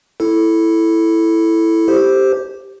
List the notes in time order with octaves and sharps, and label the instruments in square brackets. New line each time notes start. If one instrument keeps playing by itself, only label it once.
[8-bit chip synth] E4 A4
G4 C5